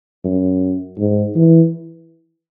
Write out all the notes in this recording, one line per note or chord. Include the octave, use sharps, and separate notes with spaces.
F#2
G#2
E3